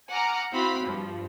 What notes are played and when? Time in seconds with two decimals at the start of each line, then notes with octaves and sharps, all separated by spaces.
0.10 F#5 G#5 A#5 D6 F6
0.53 C4 E4 F#4 F5 B5
0.86 G2 F3